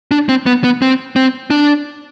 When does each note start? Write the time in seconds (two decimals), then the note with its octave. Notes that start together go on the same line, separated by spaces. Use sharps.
0.11 D4
0.29 C4
0.46 B3
0.64 B3
0.82 C4
1.16 C4
1.50 D4